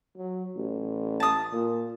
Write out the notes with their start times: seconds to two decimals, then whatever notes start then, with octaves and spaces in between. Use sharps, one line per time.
0.17 F#3
0.56 A1
1.20 A5 D#6
1.52 A#2